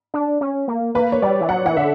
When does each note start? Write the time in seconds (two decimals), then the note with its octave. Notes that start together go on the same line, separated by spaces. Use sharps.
0.14 D4
0.41 C#4
0.68 A#3
0.95 A#3 B4
1.12 C#5
1.22 G3 D5
1.41 E3
1.49 F#3 F#5
1.66 E3 F#5
1.76 D3 E5